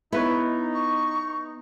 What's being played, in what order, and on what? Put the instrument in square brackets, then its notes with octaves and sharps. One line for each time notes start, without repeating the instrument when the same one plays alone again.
[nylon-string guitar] B3 [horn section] D#4 [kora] E4 B4 C#5
[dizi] C#6